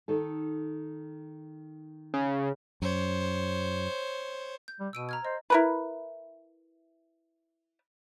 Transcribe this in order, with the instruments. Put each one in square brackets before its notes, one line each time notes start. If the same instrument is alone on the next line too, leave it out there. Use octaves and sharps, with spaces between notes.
[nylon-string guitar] D#3 D#4 A4
[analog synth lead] C#3
[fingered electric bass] F#2 [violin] C5 C#5
[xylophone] G6
[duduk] G3
[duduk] B2 [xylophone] E6 D7 D#7
[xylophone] A#5 F6 G#6
[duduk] C5 [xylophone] D#5
[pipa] E4 A#4 B4